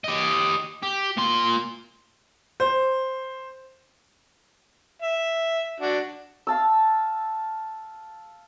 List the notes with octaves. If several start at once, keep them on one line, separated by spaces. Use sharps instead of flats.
G4 D#5
G4
A#2 C6
C5
E5
D4 F#4
F5 A5 E6